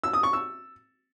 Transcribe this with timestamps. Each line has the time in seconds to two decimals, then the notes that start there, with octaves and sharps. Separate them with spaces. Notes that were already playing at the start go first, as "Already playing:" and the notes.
0.04 E6
0.13 D#6
0.23 C#6
0.33 E6